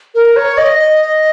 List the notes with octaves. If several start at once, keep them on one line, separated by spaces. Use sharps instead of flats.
A#4
C#5
D#5
D#5